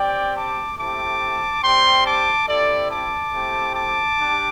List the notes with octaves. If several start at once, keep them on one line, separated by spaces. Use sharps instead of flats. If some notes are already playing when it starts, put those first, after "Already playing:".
Already playing: C4 G4 D5 G5
A5 D6
A3 C4 E4 G4 A5 D6
G3 C4 G4 G5 C6
A5 D6
C4 E4 G4 A4 D5
A5 D6
A3 C4 E4 G4
A5 D6
G3 D4 G4